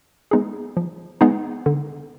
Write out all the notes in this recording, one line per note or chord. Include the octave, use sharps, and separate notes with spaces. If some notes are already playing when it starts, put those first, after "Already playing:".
G#3 B3 D#4 G#4
F3
G#3 B3 D#4 G#4
D3